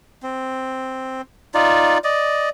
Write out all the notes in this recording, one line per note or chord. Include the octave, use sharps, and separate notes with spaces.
C4
D#4 F4 D5
D5 D#5